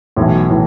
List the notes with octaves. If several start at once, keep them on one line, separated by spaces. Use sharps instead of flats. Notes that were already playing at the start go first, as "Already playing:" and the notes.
B1 A2 E3
A2 E3